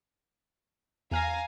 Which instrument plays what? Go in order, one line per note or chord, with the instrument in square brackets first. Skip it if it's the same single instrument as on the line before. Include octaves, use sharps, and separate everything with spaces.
[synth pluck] E2 F6 A#6 [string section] F5 G#5 A#5